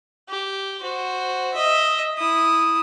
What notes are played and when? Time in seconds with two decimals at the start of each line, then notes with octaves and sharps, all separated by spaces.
0.29 G4
0.81 F#4 C5
1.54 D#5 E5
2.18 E4 D#6